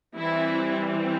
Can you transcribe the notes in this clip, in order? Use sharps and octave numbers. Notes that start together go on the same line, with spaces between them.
E3 G3 C4 E4